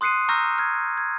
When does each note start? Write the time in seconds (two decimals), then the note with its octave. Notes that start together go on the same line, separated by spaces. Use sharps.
0.01 C6 D#6 F#6 C7 C#7 D#7
0.29 A#5 C#6 E6 F6 G6 A#6
0.58 F6 G#6
0.98 G#6